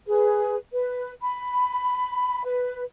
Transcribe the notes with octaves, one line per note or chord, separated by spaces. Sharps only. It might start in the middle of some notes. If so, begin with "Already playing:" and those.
G#4 B4
B4
B5
B4